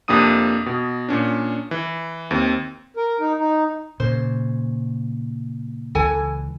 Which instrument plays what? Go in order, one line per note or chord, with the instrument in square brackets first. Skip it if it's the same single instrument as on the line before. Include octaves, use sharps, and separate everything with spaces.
[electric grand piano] F2 C3 A#3 D4 D#6 D#7
B2
A#2 C#4 D4
E3
D#2 C4
[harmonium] A#4
D#4
D#4
[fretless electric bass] A#2 C#3 [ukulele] C5
[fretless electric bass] C#2 E3 [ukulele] A4 G#5